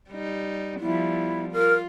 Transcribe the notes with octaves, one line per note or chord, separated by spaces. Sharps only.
G3 D#4
F3 G3 B3 E4
F4 A#4